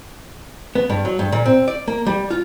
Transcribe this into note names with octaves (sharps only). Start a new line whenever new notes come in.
B3
G2
F#3
G2
A#2
C4
D5
A#3
G3
F4